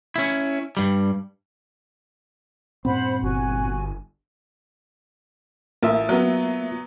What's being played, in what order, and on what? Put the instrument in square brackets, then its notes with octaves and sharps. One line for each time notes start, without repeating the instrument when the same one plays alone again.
[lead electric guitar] C#4 E4
G2 G3
[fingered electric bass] G2 A#2 C4 [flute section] C5 F#5 B5
[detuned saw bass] G1 [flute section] F#4 G#5
[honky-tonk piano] A1 [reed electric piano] A#3 F4 E5
[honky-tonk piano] F#3 B3